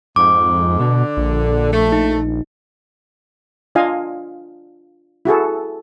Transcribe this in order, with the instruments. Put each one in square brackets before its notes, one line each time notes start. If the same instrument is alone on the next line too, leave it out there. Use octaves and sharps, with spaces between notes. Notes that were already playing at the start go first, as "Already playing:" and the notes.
[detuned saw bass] F2 [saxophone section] G#2 [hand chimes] D6
[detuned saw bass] B2 [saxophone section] D3
[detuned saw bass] A#1
[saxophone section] A3
[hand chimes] D#4
[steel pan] D4 F4 D#5 F5 G#5
E4 F#4 G#4 A4